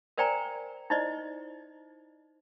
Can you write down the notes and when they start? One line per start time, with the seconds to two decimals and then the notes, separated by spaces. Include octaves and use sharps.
0.18 A#4 C5 D5 G5 G#5 A#5
0.90 D#4 E4 C5 D5 D#5